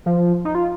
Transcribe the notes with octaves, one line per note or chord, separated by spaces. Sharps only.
F3
D#4
F4